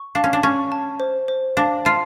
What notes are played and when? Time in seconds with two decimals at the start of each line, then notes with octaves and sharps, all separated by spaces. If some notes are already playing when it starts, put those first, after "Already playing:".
Already playing: C#6
0.15 D4 F5
0.24 C#4
0.33 D4
0.43 C#4 C#6
0.72 A5
1.00 C5
1.28 C5
1.57 D4 F5
1.85 F4 A5